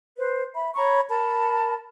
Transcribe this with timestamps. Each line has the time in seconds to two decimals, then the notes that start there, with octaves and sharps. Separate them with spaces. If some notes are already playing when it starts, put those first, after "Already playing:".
0.16 B4 C5
0.54 E5 B5
0.75 C#5 A#5 B5 C#6
1.09 A#4 A5 B5